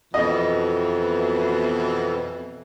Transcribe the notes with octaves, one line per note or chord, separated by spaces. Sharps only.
F2 B2 E3 D#5